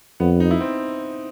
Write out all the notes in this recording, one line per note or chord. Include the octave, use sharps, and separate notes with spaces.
F2 B3
D#4
E4
C4